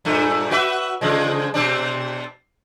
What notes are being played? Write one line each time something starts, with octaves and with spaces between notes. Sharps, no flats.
G2 A#2 A3
F#4 B4 E5
C#3 F3 G#3
B2 C4 D4